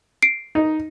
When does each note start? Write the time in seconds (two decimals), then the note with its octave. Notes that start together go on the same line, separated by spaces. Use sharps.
0.22 C7 D7
0.55 D#4